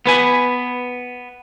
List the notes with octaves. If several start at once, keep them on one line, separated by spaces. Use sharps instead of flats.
B3 B4 G#5